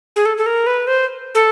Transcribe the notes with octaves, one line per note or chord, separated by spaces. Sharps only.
G#4
A4
A4
A#4
B4
C5
A4